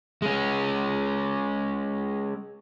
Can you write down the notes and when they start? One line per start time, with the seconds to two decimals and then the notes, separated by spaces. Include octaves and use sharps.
0.22 G#3 C#4